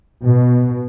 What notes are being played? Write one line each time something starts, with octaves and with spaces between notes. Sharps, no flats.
B2